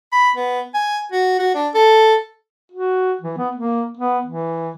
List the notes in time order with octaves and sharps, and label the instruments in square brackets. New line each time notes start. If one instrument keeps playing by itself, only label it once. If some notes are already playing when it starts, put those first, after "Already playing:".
[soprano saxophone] B5
B3
G#5
F#4
F#4
D4
A4
[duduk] F#4
E3
B3
A#3
B3
E3